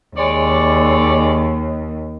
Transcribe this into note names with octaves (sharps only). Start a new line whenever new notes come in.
D#2 G#3 C#5 D5